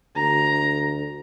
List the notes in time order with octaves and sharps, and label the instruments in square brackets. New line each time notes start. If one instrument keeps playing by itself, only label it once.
[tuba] D2 [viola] A#5